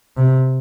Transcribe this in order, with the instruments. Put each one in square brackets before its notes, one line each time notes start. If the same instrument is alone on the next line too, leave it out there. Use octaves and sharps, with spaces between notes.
[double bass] C3